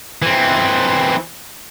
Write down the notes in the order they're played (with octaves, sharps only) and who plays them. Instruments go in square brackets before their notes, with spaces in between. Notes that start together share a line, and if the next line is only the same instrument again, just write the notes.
[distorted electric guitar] E3 C4